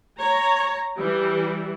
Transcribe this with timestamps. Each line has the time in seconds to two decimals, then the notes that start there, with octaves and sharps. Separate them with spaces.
0.18 C#5 A#5
0.99 E3 G3